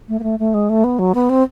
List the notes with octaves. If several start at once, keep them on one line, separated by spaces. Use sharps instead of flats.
A3
A#3
A3
A3
G#3
A3
B3
F#3
B3
C4